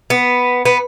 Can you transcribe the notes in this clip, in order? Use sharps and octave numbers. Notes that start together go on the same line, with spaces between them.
B3
B3